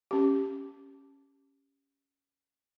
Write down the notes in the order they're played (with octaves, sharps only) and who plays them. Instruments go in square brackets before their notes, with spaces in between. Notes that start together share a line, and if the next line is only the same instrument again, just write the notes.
[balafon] C#4 G4